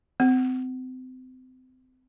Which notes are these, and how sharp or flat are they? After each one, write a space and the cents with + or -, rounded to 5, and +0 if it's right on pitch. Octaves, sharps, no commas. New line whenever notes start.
C4 -30